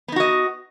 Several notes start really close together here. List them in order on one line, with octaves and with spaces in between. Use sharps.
B3 D#4 F#4 D#5